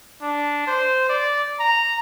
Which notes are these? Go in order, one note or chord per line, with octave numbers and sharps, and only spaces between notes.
D4
C5
D5
A#5